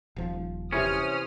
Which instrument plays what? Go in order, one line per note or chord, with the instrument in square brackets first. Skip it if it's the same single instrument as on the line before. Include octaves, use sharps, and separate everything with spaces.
[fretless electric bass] D#1 F3
[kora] C3 E3 B4 [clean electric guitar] C#4 [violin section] C5 D#6 F6